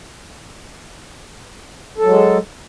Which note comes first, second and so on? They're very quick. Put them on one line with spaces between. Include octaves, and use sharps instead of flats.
A4 F#3 G#3